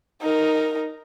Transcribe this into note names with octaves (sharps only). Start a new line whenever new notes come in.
D#4 A#4